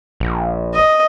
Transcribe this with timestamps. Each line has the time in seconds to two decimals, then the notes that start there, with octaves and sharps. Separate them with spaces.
0.20 A#1
0.74 D#5